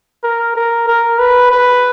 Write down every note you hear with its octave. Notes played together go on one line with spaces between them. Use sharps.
A#4
A#4
A#4
B4
B4